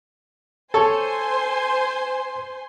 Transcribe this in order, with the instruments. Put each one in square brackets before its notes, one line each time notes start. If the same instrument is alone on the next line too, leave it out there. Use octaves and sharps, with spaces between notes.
[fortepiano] A4 C#5 [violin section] C5 G#5 C6